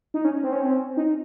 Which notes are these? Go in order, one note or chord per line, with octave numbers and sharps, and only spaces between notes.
D#4
C#4
C4
C#4
C4
D#4